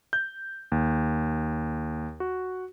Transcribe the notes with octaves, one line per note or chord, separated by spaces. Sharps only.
G6
D#2
F#4